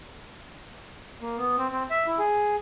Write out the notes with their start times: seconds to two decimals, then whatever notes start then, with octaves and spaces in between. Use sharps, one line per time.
1.22 A#3
1.38 B3
1.58 C4
1.72 C4
1.90 E5
2.07 E4
2.19 G#4